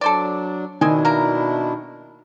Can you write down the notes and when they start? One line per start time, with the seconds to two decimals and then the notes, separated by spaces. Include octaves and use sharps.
0.01 F#3 D4 A4 C5 D5
0.81 B2 D#3 C4 D4 E4 D#5 G#5
1.05 A#3 A#4